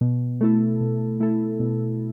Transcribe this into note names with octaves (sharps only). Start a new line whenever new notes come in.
B2
A3 E4 A4
B2
A3 E4 A4
B2